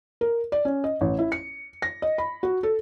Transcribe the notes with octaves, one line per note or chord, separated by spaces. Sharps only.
A#4
D5
C#4
D#5
A1
E4
C#7
A#6
D#5
B5
F#4
A4